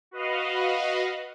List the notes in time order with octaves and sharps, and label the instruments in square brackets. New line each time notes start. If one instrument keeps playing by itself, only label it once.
[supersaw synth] F#4 B4 D#5 F5